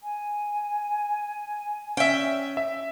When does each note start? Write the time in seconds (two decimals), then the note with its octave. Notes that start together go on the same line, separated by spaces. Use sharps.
0.03 G#5
1.97 C#4 E5 G5
2.57 E5